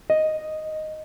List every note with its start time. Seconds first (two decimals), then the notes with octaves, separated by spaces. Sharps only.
0.10 D#5